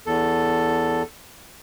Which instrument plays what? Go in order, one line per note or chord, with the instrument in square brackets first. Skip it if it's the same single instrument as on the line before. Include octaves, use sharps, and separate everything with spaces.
[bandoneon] E2 A4